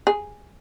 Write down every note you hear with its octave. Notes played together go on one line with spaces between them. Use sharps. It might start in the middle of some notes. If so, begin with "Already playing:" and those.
G#4